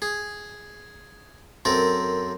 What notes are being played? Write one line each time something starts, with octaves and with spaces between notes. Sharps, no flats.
G#4
F#2 C4 A4 A#4